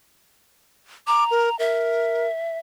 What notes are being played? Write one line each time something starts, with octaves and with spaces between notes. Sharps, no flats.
A#5 D6
A#4
A#4 E5